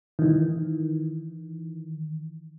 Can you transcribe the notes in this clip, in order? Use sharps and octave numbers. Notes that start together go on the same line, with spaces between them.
D#3 E3